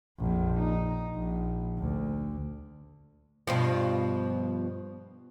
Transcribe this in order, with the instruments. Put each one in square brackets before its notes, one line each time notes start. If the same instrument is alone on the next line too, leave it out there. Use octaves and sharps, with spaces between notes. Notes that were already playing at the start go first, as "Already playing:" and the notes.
[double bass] A#1 F2
D#4
A#1
D2
[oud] G2 B2 F3